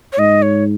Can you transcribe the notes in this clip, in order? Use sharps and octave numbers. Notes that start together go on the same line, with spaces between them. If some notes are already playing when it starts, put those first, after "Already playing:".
C#5
G#2 D#5
C#5